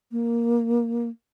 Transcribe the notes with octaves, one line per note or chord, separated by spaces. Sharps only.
A#3